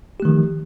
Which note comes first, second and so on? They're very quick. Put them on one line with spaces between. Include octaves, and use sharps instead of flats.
G4 A3 D#3 F3